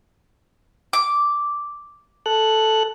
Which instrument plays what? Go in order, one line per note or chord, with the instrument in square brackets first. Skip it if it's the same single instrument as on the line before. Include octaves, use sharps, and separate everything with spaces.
[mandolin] D6
[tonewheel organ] A4 F#6